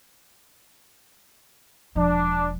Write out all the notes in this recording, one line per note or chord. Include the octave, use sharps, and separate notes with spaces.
E1 F3 D4